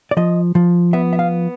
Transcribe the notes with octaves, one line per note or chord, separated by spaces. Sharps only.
D5
F3 D#5
F3
B3 E5
E5
F5